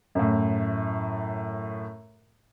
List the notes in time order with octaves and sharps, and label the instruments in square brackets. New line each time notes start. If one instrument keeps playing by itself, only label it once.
[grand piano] F#2 A2